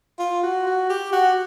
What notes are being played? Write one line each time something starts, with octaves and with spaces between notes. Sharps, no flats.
F4
F#4
F#4
G4
F#4